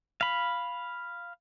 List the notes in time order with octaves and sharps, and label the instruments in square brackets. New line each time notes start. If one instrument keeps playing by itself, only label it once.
[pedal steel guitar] F5 B5